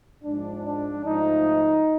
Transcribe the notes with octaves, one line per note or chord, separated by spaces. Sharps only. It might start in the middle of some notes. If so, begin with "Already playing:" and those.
G#2 F3 G#3 D4
D4
G#2 F3 A3 D#4